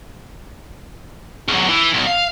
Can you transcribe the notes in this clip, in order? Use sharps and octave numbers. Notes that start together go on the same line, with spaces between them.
E2 F#3
E3
B1
F5